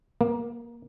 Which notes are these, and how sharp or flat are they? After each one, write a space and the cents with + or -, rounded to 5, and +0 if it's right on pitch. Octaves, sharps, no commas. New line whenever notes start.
A#3 +15